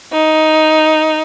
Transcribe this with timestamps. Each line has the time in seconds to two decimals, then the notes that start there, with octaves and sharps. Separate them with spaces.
0.11 D#4